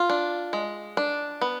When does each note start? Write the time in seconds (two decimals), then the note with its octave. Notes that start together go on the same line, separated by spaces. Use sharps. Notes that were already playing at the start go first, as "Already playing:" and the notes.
Already playing: F4
0.10 D4
0.53 G#3
0.97 D4
1.41 B3